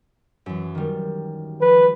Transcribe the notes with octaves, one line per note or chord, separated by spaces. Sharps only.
F#2 E3
D#3 G3
F3 B4